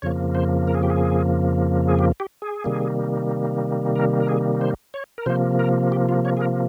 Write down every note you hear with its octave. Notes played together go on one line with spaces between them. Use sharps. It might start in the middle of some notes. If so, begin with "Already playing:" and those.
F2 C#3 F3 A#3 C#5
C5
A#4
G#4
G4
G#4
G#4
G4
G4
G#4
C3 D#3 G3 A#3
A#4
A#4
G#4
C5
C#5
A#4
C3 F3 A#3 C5
A#4
G4
F4
C#5
G#4
A#4